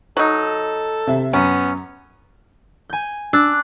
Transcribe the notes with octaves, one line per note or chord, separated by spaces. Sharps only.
F#3 D#4 A4
C3 E5
F#2 B3 C#4
G#5 G6
D4 E6 F#6